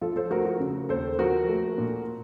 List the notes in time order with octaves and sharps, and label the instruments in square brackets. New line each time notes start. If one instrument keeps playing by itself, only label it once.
[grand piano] F3 F4 A4
A4 C5
A3 F#4 A#4
F#4
C#3
D#2 A4 C5
F3 F#4 A#4
A3
A#2